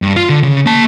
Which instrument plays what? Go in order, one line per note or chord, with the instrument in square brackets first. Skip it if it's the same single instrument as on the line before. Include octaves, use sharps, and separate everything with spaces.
[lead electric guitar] G2
F4
D3
C#3
A#3 A5